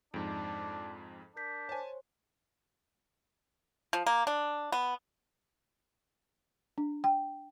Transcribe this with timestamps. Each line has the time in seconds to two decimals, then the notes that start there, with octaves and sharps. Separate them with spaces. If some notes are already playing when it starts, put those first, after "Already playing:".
0.14 F2 G#2 D4 D7
1.36 D4 A#4 G6 B6
1.69 C5 C#5 G#5 A5
3.93 F3
4.06 A#3
4.27 D4
4.72 B3
6.78 D4
7.04 G5